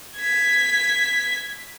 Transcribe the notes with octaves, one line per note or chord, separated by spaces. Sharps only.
G#6 B6